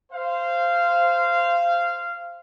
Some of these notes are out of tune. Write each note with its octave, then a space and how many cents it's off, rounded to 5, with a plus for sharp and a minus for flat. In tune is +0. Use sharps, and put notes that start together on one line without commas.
C5 -5 F5 -15